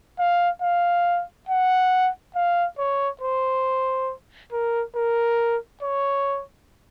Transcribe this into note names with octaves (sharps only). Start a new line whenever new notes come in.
F5
F5
F#5
F5
C#5
C5
A#4
A#4
C#5